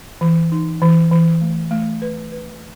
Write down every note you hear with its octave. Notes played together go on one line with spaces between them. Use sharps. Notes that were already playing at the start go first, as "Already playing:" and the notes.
E3
D#4
E3
E3
A3
A3
B4
B4